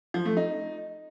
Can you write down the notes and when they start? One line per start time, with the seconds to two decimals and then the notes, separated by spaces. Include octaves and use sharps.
0.14 F3
0.25 A3
0.37 D#4